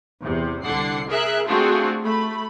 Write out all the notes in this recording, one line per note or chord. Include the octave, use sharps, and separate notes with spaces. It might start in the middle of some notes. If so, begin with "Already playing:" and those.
E2 C3
C2 D3 D4 F#5 C7
G#4 A#4 E5 F#6
A3 C4 D4 F4 F#4 G#4
A3 B5